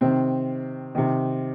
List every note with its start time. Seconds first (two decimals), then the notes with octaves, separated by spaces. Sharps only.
0.01 C3 D#3 C4
0.95 C3 D#3